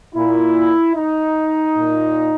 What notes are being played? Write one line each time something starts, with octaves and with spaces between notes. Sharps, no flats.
A#2 E4
D#4
A#2